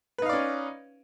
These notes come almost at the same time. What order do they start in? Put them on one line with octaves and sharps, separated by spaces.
B4 D#4 F5 D5 C#4